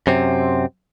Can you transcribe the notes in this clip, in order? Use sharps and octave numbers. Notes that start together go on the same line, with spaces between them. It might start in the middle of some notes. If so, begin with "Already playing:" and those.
F#2 C3 C4